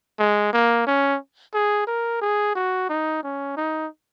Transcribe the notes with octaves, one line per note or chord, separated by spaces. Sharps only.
G#3
A#3
C#4
G#4
A#4
G#4
F#4
D#4
C#4
D#4